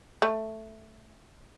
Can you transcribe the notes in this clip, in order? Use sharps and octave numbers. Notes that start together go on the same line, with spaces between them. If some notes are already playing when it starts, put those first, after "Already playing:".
A3